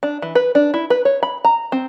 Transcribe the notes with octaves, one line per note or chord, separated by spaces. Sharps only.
D4
E3
B4
D4
E4
B4
C#5
B5
A#5
C4